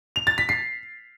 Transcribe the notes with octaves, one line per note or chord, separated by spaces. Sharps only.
F7
A6
B6
C7